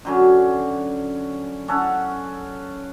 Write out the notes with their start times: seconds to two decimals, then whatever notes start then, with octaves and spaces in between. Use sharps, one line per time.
0.05 D3 F#3 C#4
1.68 C#4 A4 F#5